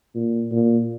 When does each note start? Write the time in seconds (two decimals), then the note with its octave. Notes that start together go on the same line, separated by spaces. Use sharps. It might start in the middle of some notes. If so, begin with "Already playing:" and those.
0.15 A#2
0.52 A#2